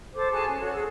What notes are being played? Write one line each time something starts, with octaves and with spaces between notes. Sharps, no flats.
A4 C5 D6
F#4 G#4 G#5 A5
C#4
F#4 A4 C#5
G#4 E6